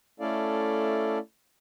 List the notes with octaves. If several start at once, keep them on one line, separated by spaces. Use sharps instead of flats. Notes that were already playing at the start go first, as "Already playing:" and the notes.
A3 C#4 E4 A4 D5 F5